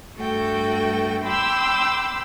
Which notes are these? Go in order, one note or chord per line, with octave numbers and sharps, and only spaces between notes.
G2 A3 F#4 A4 G5
G5 B5 C6 D6 E6 G6